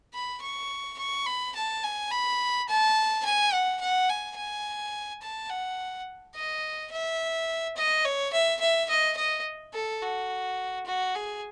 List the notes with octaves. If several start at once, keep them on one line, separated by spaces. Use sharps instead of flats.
B5
C#6
C#6
B5
A5
G#5
B5
A5
G#5
F#5
F#5
G#5
G#5
A5
F#5
D#5
E5
D#5
C#5
E5
E5
D#5
D#5
A4
F#4
F#4
G#4